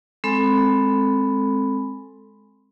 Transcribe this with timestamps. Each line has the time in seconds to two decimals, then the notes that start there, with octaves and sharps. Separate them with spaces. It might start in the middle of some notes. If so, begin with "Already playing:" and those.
0.24 G#3 C4 A4 B5